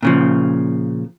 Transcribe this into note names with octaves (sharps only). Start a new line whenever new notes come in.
A#2 C#3 F3